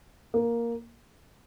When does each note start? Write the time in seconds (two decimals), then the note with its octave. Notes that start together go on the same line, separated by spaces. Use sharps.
0.34 A#3